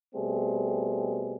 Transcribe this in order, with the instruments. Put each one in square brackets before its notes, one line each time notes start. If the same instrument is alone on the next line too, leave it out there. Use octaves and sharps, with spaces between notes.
[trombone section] B2 G3 A3 C4 G#4